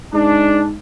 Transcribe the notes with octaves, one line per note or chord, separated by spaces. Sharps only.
G#2 D4